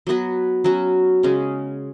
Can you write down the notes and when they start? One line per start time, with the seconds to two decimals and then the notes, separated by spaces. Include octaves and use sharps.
0.07 F#3 B3 F#4 B4
0.64 F#3 C#4 F#4
1.23 C#3 G#3 C#4